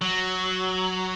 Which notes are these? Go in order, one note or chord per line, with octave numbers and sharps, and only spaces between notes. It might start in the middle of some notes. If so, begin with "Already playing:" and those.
F#3